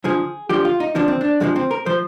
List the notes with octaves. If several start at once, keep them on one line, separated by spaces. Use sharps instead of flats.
F2 D3 F3 G#4
F2 D3 F3 G4
F4
D#4
F2 D3 F3 D4
C4
D4
F2 D3 F3 G#3
C4
A#4
F3 C5